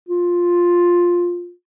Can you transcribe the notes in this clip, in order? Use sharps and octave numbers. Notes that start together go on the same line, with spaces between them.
F4